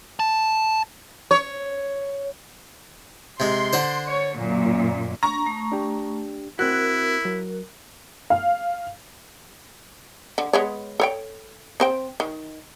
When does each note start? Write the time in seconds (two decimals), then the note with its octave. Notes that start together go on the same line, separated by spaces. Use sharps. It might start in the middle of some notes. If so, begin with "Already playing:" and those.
0.20 A5
1.31 C#5
3.40 C3 G#3 C6
3.73 D3 D4 C5
4.07 C#5
4.37 F#2 A#2
5.23 D4 A#5 C#6
5.46 A3
5.72 D4 G4
6.59 C4 E4 F#4 A#4 F#6
7.25 F#3
8.30 F5
10.38 D3
10.53 G#3 B3 C#5
11.00 A4 C#5 G5
11.80 C4 C5 G5
12.20 D#3